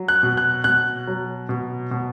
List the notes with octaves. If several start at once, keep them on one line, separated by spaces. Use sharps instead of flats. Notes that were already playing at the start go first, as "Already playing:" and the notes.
Already playing: F#3
F#6
B2
F#6
B2 F#6
F#3
B2
B2